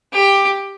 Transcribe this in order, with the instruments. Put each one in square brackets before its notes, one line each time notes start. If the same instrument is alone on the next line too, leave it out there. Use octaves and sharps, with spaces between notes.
[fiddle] G4